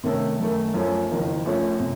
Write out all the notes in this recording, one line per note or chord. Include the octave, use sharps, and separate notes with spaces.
C3 D#3 A3 C#4 A4
F#2 D#3 A3
F#2 F3 A3 C#4
F#1 F2 D#3 A#3
A#1 A#2 A3 C#4
C3